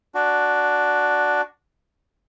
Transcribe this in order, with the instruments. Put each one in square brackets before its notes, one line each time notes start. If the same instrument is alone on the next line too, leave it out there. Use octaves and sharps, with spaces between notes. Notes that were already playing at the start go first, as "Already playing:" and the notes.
[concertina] D4 F#4